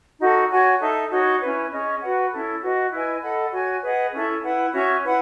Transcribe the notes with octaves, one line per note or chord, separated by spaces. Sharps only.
D#4 F#4 A4
F#4 C#5 G#5
D#4 A4 E5 A5
D#4 F#4 C#5
C#4 E4 B4
C#4 G#4 D#5
F#4 B4 F#5
C#4 E4 A4
F#4 B4 D#5
E4 B4 D#5 G#5
A4 D#5 F#5 B5
F#4 C#5 G#5
G#4 B4 D#5 F#5
C#4 E4 A4 E5
E4 B4 F#5
C#4 F#4 C#5 E5
E4 B4 F#5